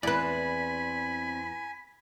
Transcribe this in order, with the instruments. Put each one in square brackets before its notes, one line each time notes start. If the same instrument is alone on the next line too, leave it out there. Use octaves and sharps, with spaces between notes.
[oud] E2 B4 [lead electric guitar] C4 D5 [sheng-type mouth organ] G#5 [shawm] B5